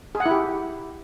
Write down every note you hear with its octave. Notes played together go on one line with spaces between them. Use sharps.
G#4
F#5
E4
G4